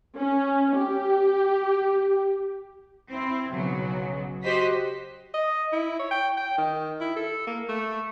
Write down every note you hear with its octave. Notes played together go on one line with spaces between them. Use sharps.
C#4
G4
C4 E4
B1 C#3 F#3
F#4 G4 C5 D#5 B6
D#5
E4
C#5
G5
G5
D#3
E4
A4
A#3
A3